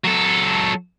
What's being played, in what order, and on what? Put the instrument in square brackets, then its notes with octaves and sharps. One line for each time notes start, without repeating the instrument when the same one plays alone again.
[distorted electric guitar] F#3 A4